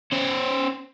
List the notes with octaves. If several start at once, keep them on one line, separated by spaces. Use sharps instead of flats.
C#4 C5